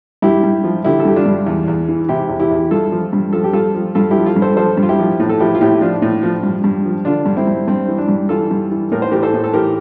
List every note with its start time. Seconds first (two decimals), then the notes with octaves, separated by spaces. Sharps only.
0.22 G2 E4 G4
0.43 G2
0.64 F3
0.84 D3 E4 G4
1.00 A4
1.05 G2 G4
1.16 D4 F4
1.26 G2
1.46 E2
1.68 E2
1.88 E3
2.09 C3 E4 G4
2.29 E2
2.40 E4 G4
2.51 E2
2.63 G4
2.71 G2 F4 A4
2.92 F3
3.13 G2
3.33 F3 A4
3.44 G4
3.53 G2 F4 A4
3.74 F3
3.95 G2 F4 A4
4.11 E4 G4
4.16 F3
4.26 F4 A4
4.36 G2
4.42 A4 C5
4.57 F3 A4 C5
4.77 G2
4.83 F4
4.89 E4 G4
4.99 F3
5.20 A2
5.29 A4
5.40 F3 E4 G4
5.55 F4
5.61 A2 E4 G4
5.81 F3 D4 F4
6.02 A2
6.23 F3
6.43 G2
6.64 G2
6.85 F3
7.05 D3 D4 F4
7.26 G2
7.37 C4 E4
7.47 G2
7.68 G2 C4
7.88 E3
7.98 D4
8.08 G2
8.29 E3 F4 A4
8.51 G2
8.72 E3
8.92 A2 A#4
9.02 C5
9.11 E3 G4 A#4
9.23 A4 C5
9.34 A2
9.44 A4
9.53 E3 G4 A#4